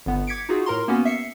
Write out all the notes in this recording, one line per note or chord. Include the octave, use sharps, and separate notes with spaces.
G1 B3
D6 G#6 B6 C#7 D7
D#4 F4 F#4 G#4
A2 A#4 A#5 C6
A#3 B3 C#4 F#4
E5 C7 C#7